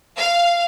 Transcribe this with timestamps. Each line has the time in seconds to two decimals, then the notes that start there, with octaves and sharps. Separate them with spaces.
0.17 F5